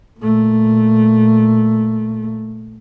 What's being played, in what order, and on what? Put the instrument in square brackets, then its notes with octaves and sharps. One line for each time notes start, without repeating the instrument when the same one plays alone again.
[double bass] A#2 A3